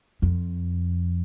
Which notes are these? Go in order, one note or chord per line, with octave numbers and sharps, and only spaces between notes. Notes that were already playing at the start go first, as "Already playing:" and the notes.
F2